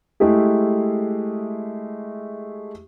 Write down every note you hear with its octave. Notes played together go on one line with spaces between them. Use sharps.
G#3 A3 E4 G4 G#4